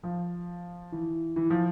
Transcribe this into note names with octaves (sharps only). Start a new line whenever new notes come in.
F3
E3
E3
F3